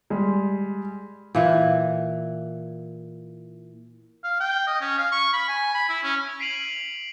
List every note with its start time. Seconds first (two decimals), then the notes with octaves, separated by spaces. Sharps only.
0.10 G3 G#3
1.35 A#2 E3
4.24 F5
4.40 G5
4.67 D#5
4.81 C#4
4.98 F5
5.12 C#6
5.33 B5
5.49 G#5
5.74 B5
5.89 E4
6.03 C#4
6.40 B6 C7 D7 D#7 F7 F#7